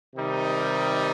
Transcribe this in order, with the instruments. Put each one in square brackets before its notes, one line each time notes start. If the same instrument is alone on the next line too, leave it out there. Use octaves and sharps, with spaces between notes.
[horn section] C3 D#3 G3 D#4